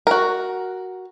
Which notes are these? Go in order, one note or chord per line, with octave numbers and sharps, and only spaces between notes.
F#4 A#4